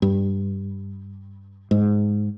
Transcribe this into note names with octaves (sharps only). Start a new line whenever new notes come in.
G2
G#2